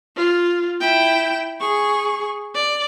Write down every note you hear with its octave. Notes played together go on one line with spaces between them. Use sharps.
F4
E4 G5
G#4 C#6
D5